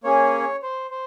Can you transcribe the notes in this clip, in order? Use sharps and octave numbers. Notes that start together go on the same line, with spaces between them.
A#3 C#4 G#4 C#5
C5
C5